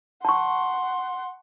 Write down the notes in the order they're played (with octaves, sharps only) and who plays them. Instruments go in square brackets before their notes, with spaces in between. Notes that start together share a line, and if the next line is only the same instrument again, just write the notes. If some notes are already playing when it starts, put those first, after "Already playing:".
[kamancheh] F#5 C6 [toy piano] A5 C#6